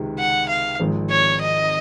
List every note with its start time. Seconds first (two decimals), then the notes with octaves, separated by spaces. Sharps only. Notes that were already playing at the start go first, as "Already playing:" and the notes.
Already playing: C#2 C3 D#3 G#3
0.19 F#5
0.49 F5
0.79 G#1 G#2 F3 G#3 C4
1.10 C#5
1.41 D#5